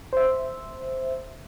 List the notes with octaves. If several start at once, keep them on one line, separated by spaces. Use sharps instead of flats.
C5 E5